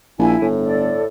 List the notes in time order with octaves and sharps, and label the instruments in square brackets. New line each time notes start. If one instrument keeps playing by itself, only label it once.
[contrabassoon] A#1 [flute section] E4 G#5
[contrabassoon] G1 [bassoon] A2
[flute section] A4 D5